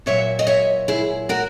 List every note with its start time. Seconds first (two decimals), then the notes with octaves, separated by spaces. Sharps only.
0.06 A#2 F#3 C#5 E5
0.39 D#5
0.47 C#5 E5
0.88 E4 G#4
1.29 F#4 A#4